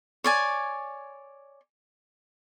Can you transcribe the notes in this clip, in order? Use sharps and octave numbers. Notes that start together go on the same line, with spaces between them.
C#5 D5 G#5